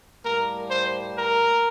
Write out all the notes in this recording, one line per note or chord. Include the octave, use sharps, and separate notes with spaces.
A2 G3 A#3 A#4
C5
A#4